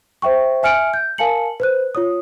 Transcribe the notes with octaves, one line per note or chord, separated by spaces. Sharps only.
C5 E5 G5 C#6
E5 G#5 F6 C#7 D7
G6
A#4 F5 G#5 A5 C#7 F#7
B4 C5 F#6
F4 C#5 D#6